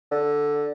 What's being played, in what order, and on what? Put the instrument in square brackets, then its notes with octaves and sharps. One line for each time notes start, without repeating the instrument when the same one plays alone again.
[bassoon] D3